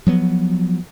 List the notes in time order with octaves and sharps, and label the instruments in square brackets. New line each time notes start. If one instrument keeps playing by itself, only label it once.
[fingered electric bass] F3 F#3 B3